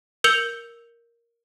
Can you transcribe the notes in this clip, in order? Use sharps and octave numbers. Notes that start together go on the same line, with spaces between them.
A#4 E6 G6 C#7 F7 G7